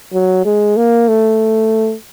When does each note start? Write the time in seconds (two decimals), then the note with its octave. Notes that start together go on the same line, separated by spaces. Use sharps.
0.13 F#3
0.45 G#3
0.77 A#3
1.08 A3